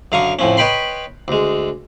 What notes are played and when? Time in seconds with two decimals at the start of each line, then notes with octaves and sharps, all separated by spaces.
0.12 F#2 D3 F5 A#5 C#6 D#6
0.39 F2 A2 F3 C#4
0.57 B4 C#5 D#5 G5 B5 C6
1.28 D2 G#3